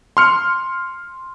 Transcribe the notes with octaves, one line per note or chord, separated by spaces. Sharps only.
C6 F6 C#7